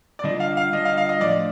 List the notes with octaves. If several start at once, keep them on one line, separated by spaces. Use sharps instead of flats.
D5
D3 G3 D4 F4 D#5
F5
F5
D3 G3 D4 F4 D#5
F5
F5
D#5
A2 F3 A3 D4 D5